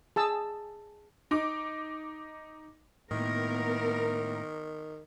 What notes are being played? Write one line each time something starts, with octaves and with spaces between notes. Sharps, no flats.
G#4 A5 E6
D#4 D6
A2 D#3 A#3 B3 A#4